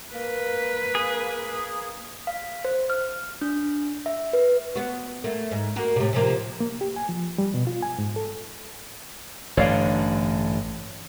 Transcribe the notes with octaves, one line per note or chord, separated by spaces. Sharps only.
A#3 B4
G#4
F5
C5
F6
D4
E5
B4
B3 F#4
A3 A#3
G#2
A#3 F#4 A#4
A2 C3
C3 F3 A#3
A#3
G4
G#5
F3
G3
B2
F4
G#5
G#2
A4
A1 G2 D3 C#5 D5 F5